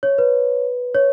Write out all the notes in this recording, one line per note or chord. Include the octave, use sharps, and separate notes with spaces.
C#5
B4
C#5